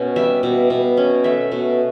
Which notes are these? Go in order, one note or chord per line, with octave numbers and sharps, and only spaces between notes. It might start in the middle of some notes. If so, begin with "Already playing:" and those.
Already playing: B2 C#4
G3 E5
B2
B2
C#4
A3 E5
B2